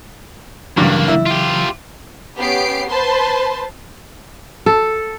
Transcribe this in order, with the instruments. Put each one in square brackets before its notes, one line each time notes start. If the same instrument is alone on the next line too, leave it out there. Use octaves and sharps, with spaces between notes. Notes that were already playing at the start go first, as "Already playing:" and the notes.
[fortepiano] G2 [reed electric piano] C#3 E3 F#3 [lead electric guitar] A#3 F#4
[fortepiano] E4
[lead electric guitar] F4 G4
[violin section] B3 C#4 G4 C7 D7
B4 C5 A5 C6
[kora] A4